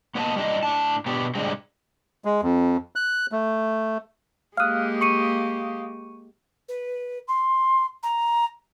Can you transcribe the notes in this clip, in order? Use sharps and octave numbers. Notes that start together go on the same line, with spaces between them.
A#3 B3 D#4 D#5 F#5 A5
G3 D4 D#4 D#5
A2 D4 A5
B2 B3 D4 G4
G#2 D3 G3 G#3 C4
G#3
F2
F#6
A3
G#3 A#3 G4 F5 D#6 F6 F#6
C#6 C#7 D#7
B4
C6
A#5